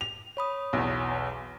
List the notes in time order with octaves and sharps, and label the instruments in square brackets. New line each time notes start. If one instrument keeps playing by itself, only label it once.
[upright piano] F7
[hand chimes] C#5 B5 D#6
[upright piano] B1 E2